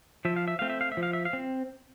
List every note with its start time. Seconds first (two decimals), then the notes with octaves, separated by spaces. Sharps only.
0.25 F3 E5
0.36 F5
0.48 E5
0.59 A3 C4 F5
0.70 E5
0.81 F5
0.92 E5
0.97 F3
1.03 F5
1.13 E5
1.25 F5
1.33 C4